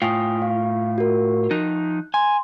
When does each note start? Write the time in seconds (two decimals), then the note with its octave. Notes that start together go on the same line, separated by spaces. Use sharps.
0.02 A2 F4 G5 G#5 D#6
0.42 F5
0.98 F#4 A#4
1.51 F3 D#4 F#6
2.14 G#5 C6